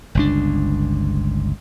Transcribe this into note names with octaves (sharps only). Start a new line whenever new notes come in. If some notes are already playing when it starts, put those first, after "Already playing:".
G1 C#2 D4